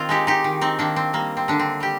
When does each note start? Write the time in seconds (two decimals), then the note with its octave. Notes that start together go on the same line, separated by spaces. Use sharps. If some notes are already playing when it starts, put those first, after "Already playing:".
Already playing: D#3 C4 F4
0.09 G#3 D#4 G4
0.27 D#4 G4
0.44 D#3
0.61 C4 D#4
0.79 D#3 A#3 D4
0.96 C4
1.13 G3 A#3
1.37 C4
1.48 D3 D4
1.59 C4
1.80 G3 G4